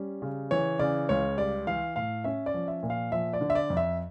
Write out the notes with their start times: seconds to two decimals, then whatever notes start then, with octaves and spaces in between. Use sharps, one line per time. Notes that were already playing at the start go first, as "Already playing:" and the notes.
Already playing: G3 C#4
0.22 C#3
0.51 E3 C#5
0.79 C#3 D5
1.09 C#2 C#5
1.38 G3 D5
1.67 E3 F5
1.96 A2 F5
2.24 C#4 E5
2.46 D5
2.54 F3
2.68 E5
2.83 A#2
2.90 F5
3.12 F3 E5
3.33 D5
3.41 D3
3.50 E5
3.55 D5
3.70 F2
3.77 E5